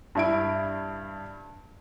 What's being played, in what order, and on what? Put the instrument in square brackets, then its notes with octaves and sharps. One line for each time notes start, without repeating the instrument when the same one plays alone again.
[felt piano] G2 E4 D7